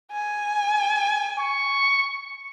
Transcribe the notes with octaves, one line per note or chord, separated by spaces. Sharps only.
G#5
C#6